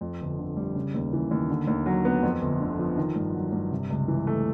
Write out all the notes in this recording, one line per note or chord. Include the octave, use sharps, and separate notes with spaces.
F2
G1
D3
G3
C#3
D#2
E3
D#2
D3
D#2
F#3
B3
F2
G1
D3
F3
D#3
G2
F#3
G2
C3
C#2
E3
A3